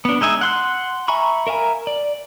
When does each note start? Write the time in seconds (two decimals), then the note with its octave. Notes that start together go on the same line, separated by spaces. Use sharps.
0.05 B3 D4
0.21 G#3 D#4 E5 G#5
0.41 F#5 C6 F#6
1.08 E5 G#5 A#5 B5 C#6
1.47 A#4 E5 F5 G#5 A#5
1.87 D5